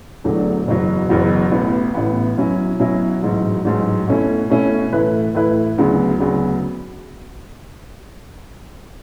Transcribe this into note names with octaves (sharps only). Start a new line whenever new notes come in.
E1 E2 D3 F#3 A3
F#1 E2 B2 F#3 B3
F#1 E2 B2 F#3 B3
A1 A2 E3 B3
A1 A2 E3 B3
B2 F#3 C#4 E4
B2 F#3 C#4 E4
A1 G#2 F#3
A1 G#2 F#3
B2 A3 C#4 E4
B2 A3 C#4 E4
A2 E3 A3 E4 B4
A2 E3 A3 E4 B4
D2 C#3 F#3 B3
D2 C#3 F#3 B3